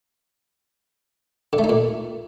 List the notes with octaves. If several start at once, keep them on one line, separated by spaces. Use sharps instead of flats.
D3
A3
D#4
A#2